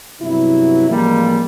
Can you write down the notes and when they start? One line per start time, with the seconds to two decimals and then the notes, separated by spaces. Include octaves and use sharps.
0.21 G2 C3 F#3 B3 E4
0.90 A1 F3 G3 G#3 A#3